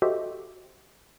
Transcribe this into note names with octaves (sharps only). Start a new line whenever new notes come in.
F#4 G4 A4 C5 D#5 E5